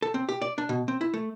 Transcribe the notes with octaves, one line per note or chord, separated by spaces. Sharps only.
A4
C4
G4
D5
D4
B2
C4
E4
A3